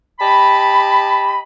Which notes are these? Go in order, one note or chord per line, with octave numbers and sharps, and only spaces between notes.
G4 D#5 A5 B5